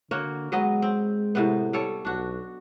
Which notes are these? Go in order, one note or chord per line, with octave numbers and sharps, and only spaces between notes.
D3 A#3 F#4 C#5
F#3 G#3 B3 D#5
C4
A2 C3 B3
G3 A4 C#5
B1 D4 F#4